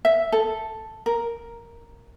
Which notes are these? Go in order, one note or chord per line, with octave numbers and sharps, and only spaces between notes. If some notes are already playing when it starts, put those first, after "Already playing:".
E5
A4
A#4